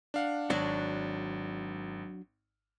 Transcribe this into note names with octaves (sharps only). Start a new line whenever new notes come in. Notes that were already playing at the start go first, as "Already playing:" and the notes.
D4 F5 F#5
G#1 F#3 D4 F#4